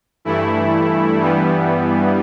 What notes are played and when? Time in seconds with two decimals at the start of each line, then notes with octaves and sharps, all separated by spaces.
0.25 G2 E3 A3 E4
1.17 G2 E3 G3 B3